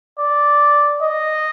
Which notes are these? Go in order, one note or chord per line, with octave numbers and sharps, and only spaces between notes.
D5
D#5